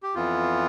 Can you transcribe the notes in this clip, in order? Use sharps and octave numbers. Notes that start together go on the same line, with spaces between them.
G4
F2 E3 B3 F4